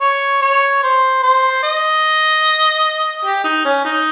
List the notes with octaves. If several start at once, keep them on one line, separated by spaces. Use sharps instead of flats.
C#5
C#5
C5
C5
D#5
G4
D#4
C#4
D#4